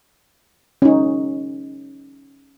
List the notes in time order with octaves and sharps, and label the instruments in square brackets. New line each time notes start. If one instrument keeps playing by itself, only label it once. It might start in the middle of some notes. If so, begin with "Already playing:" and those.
[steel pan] C#4 D#4